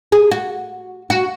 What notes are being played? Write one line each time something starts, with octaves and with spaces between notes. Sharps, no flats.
G#4
F#4
F#4